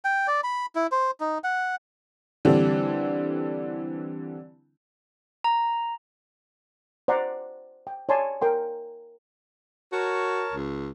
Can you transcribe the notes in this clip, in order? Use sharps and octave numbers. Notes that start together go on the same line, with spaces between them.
G5
D5
B5
E4
C5
D#4
F#5
D3 E3 G3 C4 D4
A#5
C5 D5 F#5 A#5 C6
G5
C#5 D5 G#5 A5 C6
A#4 G5 C6
F#4 A#4 C#5 A5
C#2